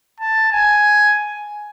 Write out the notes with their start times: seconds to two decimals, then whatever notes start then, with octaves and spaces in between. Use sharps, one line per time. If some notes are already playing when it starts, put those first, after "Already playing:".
0.20 A5
0.52 G#5